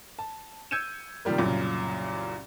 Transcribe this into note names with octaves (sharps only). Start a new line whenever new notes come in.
A5
E6 G6 G#6 C#7 D#7 E7
C3 D#3 F3 G3 A#3
C2 F#2 A#2 C#3